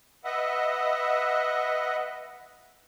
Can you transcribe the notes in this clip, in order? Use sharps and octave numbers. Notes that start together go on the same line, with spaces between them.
B4 D#5 E5 F#5